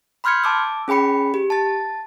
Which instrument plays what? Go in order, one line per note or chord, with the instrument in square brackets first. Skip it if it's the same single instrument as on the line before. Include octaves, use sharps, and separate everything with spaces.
[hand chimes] B5 C6 F6 G6 G#6 C#7
A5 D6 E6
C#4 G#4 G5 B5 C#7
G4
A5 A6